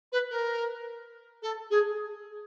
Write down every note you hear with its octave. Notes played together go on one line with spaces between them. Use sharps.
B4
A#4
A4
G#4